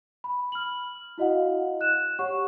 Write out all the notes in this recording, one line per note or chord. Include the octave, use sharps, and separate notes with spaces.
B5
F6 F#7
E4 F#4 D#5 F5 F#5
F#6 E7
G4 C#5 F#5 C#6